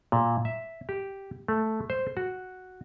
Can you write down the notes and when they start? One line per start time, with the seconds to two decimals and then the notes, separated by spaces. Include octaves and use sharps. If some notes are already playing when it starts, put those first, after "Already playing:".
0.12 A#2
0.45 E5
0.89 G4
1.48 A3
1.90 C5
2.17 F#4